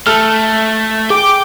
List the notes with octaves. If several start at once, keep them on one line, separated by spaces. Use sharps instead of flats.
A3 A4 F6
G#4 G5 D6